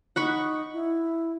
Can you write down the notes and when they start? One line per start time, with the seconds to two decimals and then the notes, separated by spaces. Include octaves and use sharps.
0.16 D#4 F#5 B5 C#6
0.73 E4